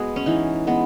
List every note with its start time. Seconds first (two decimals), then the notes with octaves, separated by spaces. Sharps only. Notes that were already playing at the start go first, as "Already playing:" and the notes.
Already playing: G#3 B3 F#4 G#4
0.16 C#4
0.26 E3 D#4
0.67 G#3 B3